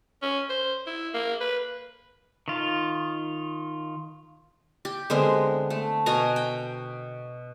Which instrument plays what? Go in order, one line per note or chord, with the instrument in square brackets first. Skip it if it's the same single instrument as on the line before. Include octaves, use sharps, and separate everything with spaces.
[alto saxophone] C#4
C5
E4
A#3
B4
[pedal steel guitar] D#3 F4
[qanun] G4
D3 G#3 B3 C4
A3
B2 F#4 G#5 A#5
G5